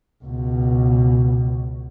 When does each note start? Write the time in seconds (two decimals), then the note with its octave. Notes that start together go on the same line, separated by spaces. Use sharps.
0.24 C#2 B2